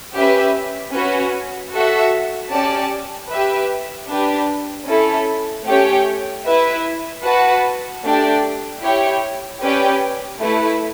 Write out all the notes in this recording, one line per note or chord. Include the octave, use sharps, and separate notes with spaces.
C#4 G4 B4 E5
C#4 F#4 B4
F#4 A4 E5
C#4 G4 D5 A5
G4 B4 E5
D4 G4 B4
C#4 E4 A4
A3 C#4 G4 C#5 G5
E4 B4 E5
F#4 B4 F#5 A5
A3 D4 G4 D5 G5
E4 G4 C#5 G5
C#4 G4 B4 D5 G5
A3 E4 B4